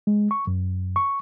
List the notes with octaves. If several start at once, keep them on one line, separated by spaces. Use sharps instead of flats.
G#3
C#6
F#2
C#6